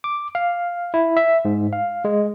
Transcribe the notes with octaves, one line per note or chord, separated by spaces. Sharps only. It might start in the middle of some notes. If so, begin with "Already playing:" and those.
D6
F5
E4
E5
G#2
F5
G#3